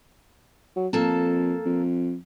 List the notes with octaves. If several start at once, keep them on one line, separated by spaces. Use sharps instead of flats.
F#3
F2 A#3 A4 A5
F2